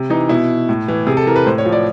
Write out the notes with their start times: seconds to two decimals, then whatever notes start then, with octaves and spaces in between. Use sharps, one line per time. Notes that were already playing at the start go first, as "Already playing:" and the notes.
Already playing: C3
0.10 E3 D#4
0.29 B2 E4
0.69 A2
0.88 E3
1.07 C3 G#4
1.17 A4
1.26 E3 A#4
1.36 B4
1.46 A2 C5
1.58 C#5
1.66 F3
1.72 D5